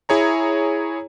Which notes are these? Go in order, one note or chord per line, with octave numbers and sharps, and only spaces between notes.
E4 G#4 C#5 A#5